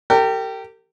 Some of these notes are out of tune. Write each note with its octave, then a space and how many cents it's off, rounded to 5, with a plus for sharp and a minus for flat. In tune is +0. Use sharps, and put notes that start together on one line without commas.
G4 -10 A#4 -45